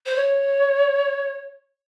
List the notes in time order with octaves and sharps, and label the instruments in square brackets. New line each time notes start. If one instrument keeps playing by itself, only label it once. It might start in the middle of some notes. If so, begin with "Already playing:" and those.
[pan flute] C5
C#5